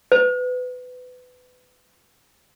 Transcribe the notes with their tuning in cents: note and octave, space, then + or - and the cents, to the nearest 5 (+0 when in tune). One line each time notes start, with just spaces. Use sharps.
B4 +25